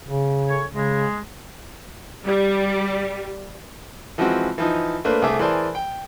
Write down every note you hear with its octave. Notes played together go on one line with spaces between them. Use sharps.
C#3
C#4 A4 C#5
C#3 G#3
G3
E3 F3 G#3 C4 F#4
E3 F3 D#4
A3 A#3 D4 B4 C5
C2 A3 G#4 E5 D6
E3 G#4 A#4 C5 D5 A5
G5